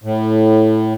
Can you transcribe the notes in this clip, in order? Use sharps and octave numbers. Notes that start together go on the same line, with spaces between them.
A2